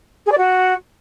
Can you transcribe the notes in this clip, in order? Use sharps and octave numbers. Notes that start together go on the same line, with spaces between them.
G#4
D5
F#4